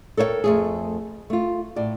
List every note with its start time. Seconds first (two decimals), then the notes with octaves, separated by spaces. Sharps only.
0.17 A4 A#4 C#5 F5 G5
0.44 F2 A3 G#4
1.30 A3 F4
1.76 A2 D5